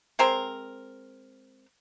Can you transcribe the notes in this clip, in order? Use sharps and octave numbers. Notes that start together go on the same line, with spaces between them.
G#3 C4 A#4